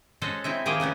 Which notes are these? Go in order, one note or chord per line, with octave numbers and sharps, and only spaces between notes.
G#3 C#4 F#4 A4 C5
C4 D#4 E4 E5
D#3 F3 A#3 D#4 G#4 G5
C#3 A3 B3 C#4